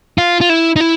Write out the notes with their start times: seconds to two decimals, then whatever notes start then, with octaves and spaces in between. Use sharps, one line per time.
0.18 F4
0.41 F4
0.49 E4
0.76 D#4
0.81 E4